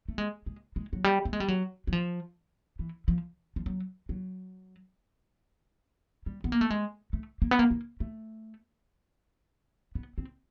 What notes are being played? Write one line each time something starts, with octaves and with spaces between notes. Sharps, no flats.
A3
G#3
G#3
G#3
F#3
G3
A3
G#3
G3
F#3
F#3
F3
E3
F3
F3
F#3
F#3
G3
B3
A#3
A3
G#3
A3
A#3
B3
A#3
A#3
A3
B3
C4